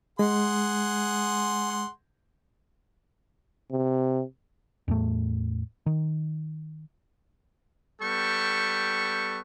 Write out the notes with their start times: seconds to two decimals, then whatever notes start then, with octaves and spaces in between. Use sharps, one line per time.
0.19 G#3 G#4 F#5 C6
3.71 C3
4.88 E2 A2 A3
5.86 D#3
8.02 G3 B3 A4 G5 C#6